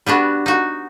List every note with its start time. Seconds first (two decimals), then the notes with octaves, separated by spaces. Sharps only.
0.06 G3 B3 D4 F#4
0.46 D#4 F#4